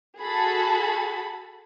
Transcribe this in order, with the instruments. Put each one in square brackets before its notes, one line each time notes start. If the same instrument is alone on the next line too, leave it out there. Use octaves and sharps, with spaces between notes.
[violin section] F#4 G#4 A4 A5 B5